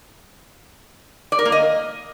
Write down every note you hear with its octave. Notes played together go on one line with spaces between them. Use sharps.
D5
A#4
A#3
D#5